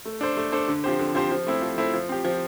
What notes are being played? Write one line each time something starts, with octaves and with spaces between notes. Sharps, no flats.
A3
D4 A4 C5
A3
D4 A4 C5
D3
F3 C4 G4 C5
D3
F3 C4 G4 C5
F3
A3 C4 E4
F3
A3 C4 E4
F3
C4 G4
F3